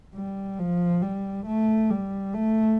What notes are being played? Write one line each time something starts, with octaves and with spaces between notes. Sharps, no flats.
G3
F3
G3
A3
G3
A3